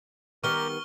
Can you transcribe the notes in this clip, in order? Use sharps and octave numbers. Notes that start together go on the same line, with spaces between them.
D#3 G3 B3 G4 A#4 C#6 F6 G7